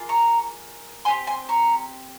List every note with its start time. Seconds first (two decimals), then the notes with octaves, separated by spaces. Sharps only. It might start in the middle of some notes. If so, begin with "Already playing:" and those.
Already playing: A#3 F4 G#4
0.09 A#5 C#6
1.05 C4 G4 G#5 C6
1.27 G#5 C6
1.49 A#5 C#6